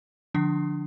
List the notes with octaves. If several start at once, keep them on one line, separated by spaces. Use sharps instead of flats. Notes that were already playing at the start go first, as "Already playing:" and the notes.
D3 F3 D4